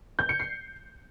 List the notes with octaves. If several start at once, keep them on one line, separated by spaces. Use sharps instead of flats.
G6
C#7
C7